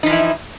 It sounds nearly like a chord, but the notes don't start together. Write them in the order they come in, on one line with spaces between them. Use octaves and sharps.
D#4 F3 E3 E4